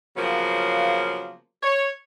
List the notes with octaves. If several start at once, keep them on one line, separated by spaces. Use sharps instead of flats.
C#3 F3 F#3 A#3 B3 A#4
C#5